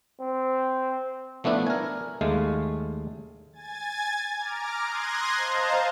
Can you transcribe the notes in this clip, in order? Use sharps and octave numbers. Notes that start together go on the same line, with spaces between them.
C4
F3 A3 B3 D4 E4
A#4 G#5
D#2 G#3 A3 F5
G#5 G#6 A6
A#5 D6 F6
C6 D#6 F#6 G#6 A#6
C5 D#5 F5 A5 A#5